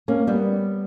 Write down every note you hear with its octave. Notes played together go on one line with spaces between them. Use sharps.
A#3 C#4
G3 B3